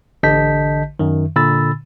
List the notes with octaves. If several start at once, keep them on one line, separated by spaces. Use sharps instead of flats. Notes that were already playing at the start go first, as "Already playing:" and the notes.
A1 D3 D#5 A5 G6 B6
F#2 D#3
A#2 D3 B5 E6 A6